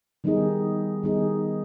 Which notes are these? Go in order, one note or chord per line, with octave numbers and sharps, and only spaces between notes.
D#3 G3 B3 D#4 G#4
D#3 G3 B3 D#4 G#4